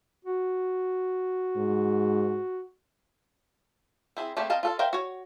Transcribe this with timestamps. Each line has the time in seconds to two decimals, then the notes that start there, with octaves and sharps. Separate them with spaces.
0.25 F#4
1.56 G#2
4.17 C4 E4 G#4
4.37 A3 A#3 C4 G4 G#4
4.50 C4 A#4 D#5 F5 A5
4.63 F4 A4 F5
4.79 A#4 C5 E5 F5 G5
4.93 F#4 C#5